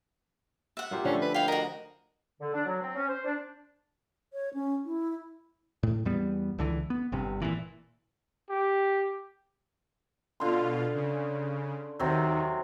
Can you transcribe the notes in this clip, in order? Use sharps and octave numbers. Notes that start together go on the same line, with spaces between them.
E5 F#5
A#3 F4 G4
D3 F3 A3 C#4
B4
E4 F5 G5
F#4 A#4 D#5
D3
D4
F#3
C4
C#4
C5
D4
C#5
C#4
E4
A2
E2 G3 B3
C#2 D3 E3
B3
G1 G2 C3
A#2 E3
G4
B2 D3 F4 F5 C6
C#3
D#2 C3 D#3 F#3